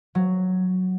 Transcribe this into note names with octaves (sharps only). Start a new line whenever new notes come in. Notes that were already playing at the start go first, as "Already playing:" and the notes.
F#3